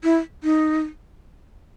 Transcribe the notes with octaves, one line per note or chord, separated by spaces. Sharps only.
E4
D#4